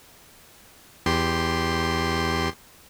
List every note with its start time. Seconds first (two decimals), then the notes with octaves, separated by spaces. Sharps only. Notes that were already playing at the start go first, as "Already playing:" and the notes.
1.06 E2 G4 C6